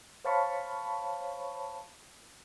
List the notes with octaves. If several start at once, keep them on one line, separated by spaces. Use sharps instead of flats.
C5 C#5 F5 A5 B5 C#6